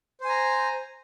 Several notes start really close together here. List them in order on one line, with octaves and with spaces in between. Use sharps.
C5 G#5 A#5